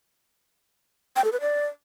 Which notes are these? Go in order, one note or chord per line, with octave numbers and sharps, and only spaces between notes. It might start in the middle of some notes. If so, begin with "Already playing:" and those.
G5
A4
B4
D5